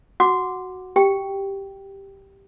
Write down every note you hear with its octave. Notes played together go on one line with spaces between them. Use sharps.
F#4 F#5 D6
G4 G5